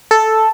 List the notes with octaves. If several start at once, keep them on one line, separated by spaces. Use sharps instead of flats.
A4